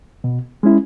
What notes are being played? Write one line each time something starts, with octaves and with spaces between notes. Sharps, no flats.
B2
G#3 C#4 E4